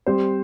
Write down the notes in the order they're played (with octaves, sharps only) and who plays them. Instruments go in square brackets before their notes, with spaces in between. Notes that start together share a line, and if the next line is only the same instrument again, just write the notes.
[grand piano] G3 C4 G4 C5